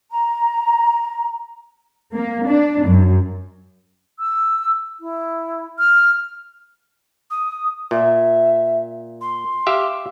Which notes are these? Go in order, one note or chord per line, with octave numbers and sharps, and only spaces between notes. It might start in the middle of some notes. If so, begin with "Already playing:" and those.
A#5
A#3
D4
F#2
E6
E4
F6
D#6
A#2 E5
C6
G4 E5 F5